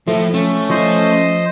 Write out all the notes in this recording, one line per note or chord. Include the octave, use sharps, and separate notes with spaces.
A2 F3 A3
A3 C#4
F3 C5 D#5